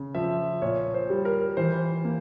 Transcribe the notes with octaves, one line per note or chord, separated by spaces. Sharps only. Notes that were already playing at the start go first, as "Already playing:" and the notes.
Already playing: C#3
F3 E5
A#2 C#5
C5
G3
A#4
E3 C5
A#3